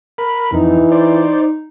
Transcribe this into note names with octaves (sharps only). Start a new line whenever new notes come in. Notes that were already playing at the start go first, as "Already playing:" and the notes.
A#4 B5
F2 E3 D#4
C5 D5